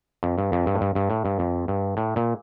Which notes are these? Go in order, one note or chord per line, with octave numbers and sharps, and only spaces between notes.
F2
G2
F2
G2
A2
G2
G2
A2
G2
F2
G2
A2
A#2